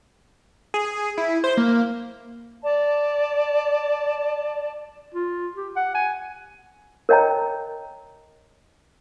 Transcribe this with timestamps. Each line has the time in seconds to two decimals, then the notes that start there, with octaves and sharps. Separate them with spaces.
0.74 G#4
1.18 E4
1.44 C5
1.57 A#3
2.62 D5 A5
5.15 F4
5.56 G4
5.76 F#5
5.95 G#5
7.09 A#4 C#5 D#5 G5 A#5